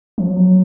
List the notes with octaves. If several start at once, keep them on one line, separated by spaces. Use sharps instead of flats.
F3
F#3